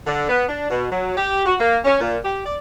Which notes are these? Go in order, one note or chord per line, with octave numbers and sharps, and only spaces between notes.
D3
B3
D4
B2
F#3
G4
F#4
A#3
C#4
A#2
G4
D5